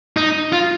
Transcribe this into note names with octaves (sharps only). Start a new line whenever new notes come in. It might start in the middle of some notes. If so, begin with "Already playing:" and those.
D#4
F4